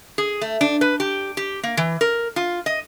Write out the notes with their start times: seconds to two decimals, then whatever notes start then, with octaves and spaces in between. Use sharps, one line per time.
0.18 G#4
0.41 A3
0.61 D4
0.81 B4
1.00 G4
1.37 G4
1.63 A#3
1.77 E3
2.01 A#4
2.36 F4
2.66 D#5